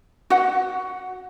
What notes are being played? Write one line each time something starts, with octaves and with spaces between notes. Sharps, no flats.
F#4 F#5